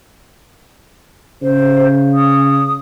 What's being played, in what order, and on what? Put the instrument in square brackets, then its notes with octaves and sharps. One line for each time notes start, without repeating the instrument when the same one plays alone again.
[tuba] C#3 [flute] C5
[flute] D#6